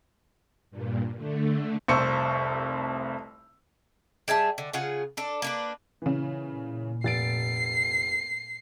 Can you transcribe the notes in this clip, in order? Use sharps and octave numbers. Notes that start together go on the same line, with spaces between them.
G2 A#2
D3 A3
F1 C2 C5 C#6 E6 C#7
G3 G#4 E5 A5
D3
C#3 F4 G#4 F#5
D4 A4
A#3 D4 B4
A#2 C#3 E3
F1 A6 C7 D7